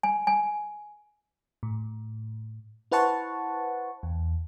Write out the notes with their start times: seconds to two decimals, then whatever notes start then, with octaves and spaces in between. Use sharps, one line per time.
0.03 G#5
0.27 G#5
1.63 A2
2.92 E4 B4 C5 F#5 A5 C#6
4.03 E2